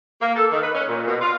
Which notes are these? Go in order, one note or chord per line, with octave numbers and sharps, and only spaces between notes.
A#3
A4
D#3
B4
C#4
A#2
B2
F4